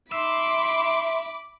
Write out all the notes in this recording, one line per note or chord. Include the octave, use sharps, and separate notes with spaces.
D#4 E5 B5 C6 D6